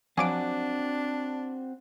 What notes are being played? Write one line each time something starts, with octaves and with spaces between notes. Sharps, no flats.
F3 F#3 C4 D4 F#4 G#5 D6 D7